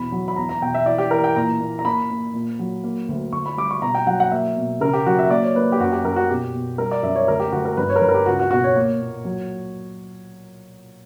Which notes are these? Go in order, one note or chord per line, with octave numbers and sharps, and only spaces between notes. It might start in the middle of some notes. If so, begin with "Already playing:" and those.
Already playing: E2 B2 B5
F#3
B5
E2 A#5
A#5
B2 G5
E5
E3 D5
G4
E3 A#4
G5
A#2 A#5
A#3
A#5
A#3 B5
A#3
A#2
F#3
A#3
D2
D2 C#6
B5
G3 D6
C#6
B2 A#5
G5
F#3 F#5
F#5
A#3 E5
B2
C#3 A#4
G4
F#3 F#4
E5
A#3 D5
C#5
A#3 B4
G4
F#2 F#4
G4
F#2 A#4
F#4
B2 G4
B2
G3 A#4
D5
F#2 E5
C#5
D2 A#4
G4
D2 F#4
A#4
G2 B4
C#5
A#4
G2 B4
A#4
G4
C#2 F#4
F#4
B2 F#4
C#5
A#3
A#2
F#3